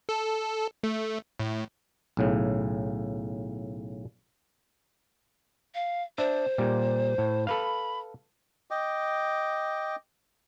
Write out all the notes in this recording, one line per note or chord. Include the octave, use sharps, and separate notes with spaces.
A4
A3
A2
B1 A2 C#3
F5
D4 C5 E5
A#2 G3
A2
A4 B4 F5 B5
D#5 G5 D6